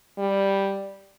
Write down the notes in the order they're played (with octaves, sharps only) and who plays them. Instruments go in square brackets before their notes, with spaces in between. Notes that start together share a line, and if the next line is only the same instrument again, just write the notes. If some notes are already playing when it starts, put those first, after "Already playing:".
[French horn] G3